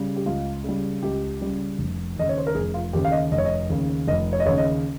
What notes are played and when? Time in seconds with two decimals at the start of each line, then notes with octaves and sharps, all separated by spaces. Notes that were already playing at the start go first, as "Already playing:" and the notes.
Already playing: C#3 G3
0.16 G4
0.26 C#2 F4
0.64 C#3 G3
1.03 C#2 G4
1.41 C#3 G3
1.79 F1
2.16 D#2 C#3 D#5
2.29 C#5
2.38 C5
2.47 A#4
2.55 F1 G#4
2.74 F4
2.93 D#2 C#3 G4
3.05 F5
3.12 D#5
3.32 F1 D#5
3.38 C#5
3.45 D#5
3.70 D#2 C#3
4.08 F1 D#5
4.33 C#5
4.40 D#5
4.46 D#2 C#3 C#5
4.58 D#5